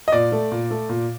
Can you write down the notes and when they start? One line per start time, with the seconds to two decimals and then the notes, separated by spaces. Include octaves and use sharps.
0.08 D#5
0.12 A#2 D5
0.32 A3
0.52 A#2
0.71 A3
0.89 A#2